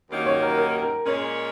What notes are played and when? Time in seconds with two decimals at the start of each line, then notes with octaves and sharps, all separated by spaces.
0.11 D#2 D#3 F#3 A#3 C#4
0.26 C#5
0.42 A#4
0.58 A#4
0.82 A#4
1.06 A#2 G#3 C#4 A#4